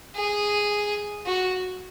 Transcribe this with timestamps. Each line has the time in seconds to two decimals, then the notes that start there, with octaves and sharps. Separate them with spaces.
0.15 G#4
1.26 F#4